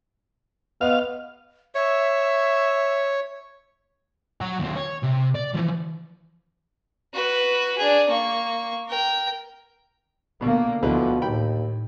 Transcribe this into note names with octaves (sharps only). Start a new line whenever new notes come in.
B3 D#5 F5
C#5 E5
F#3 F#5
D#2 C4
C#5
C3
D5
E3 F3
F#4 B4
D4 G#4
A#3 C#6
A#4 G5
B2 D3 A#3 B3
D2 B2 D3 F3 E4 B4
D#2 A2 G5 B5